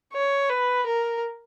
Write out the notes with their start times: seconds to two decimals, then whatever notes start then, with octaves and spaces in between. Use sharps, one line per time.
0.13 C#5
0.49 B4
0.87 A#4